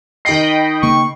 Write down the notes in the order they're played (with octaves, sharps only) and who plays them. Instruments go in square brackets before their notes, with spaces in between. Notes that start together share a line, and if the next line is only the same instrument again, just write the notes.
[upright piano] D#3 C7 [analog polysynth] D#5 G5 B5
[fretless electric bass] C#3 A#3 [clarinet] C#6